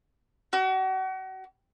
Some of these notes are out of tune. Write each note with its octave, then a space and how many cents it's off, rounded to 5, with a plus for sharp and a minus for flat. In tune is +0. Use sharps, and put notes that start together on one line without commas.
F#4 +35